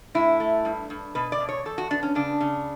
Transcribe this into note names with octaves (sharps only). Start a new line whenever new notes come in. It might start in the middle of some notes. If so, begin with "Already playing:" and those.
A2 E4
A3
G2
G2
B2 B4
D5
B2
C#5
E2 A4
F#4
B3 D4
C#4
C#3 D4
C#3